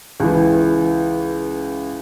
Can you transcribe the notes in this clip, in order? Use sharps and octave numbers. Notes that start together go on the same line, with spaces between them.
C#2 E3